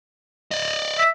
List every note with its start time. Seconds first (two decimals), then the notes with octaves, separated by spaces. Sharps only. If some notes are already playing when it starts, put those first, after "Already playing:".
0.51 D5 D#5
0.98 E5